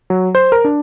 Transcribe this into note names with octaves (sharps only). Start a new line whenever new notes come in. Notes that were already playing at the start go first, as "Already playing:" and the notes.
F#3
C5
A#4
D4